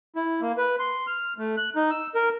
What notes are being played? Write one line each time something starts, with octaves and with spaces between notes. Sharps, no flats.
E4
A#3
B4
C6
F6
A3
F#6
D#4
E6
A#4